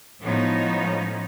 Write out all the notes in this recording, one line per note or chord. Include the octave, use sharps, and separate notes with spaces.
A2 F3 G#3 B3 C#4 D#4